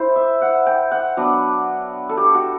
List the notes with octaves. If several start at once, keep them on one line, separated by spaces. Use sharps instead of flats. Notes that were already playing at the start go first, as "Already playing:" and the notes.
Already playing: E4 C5
E5
F#5
G5
F#5
F#3 B3 D4
A4
G4
F#4